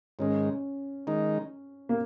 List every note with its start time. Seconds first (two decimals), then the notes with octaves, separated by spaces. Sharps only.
0.19 G#2 D#3 G#3 C#4
1.07 D#3 G#3 D#4
1.89 A#3